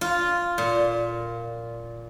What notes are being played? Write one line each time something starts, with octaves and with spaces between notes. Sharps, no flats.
F4
A#2